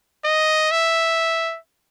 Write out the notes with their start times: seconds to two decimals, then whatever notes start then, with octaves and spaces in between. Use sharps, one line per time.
0.25 D#5
0.71 E5